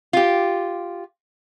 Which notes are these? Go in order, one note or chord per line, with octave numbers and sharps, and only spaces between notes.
F4 G4